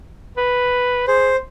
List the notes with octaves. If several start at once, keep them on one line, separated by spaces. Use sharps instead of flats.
B4
G#4 C5